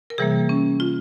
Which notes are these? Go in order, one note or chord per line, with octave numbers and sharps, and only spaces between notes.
A#4
C3 E3 G3 A#3 G#4
C#4
F4